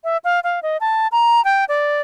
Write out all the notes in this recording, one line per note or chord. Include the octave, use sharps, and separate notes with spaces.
E5
F5
F5
D#5
A5
A#5
G5
D5